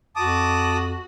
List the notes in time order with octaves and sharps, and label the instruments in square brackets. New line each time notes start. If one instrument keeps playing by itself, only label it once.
[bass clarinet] F2 [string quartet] F#4 [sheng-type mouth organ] A5 D6 D#6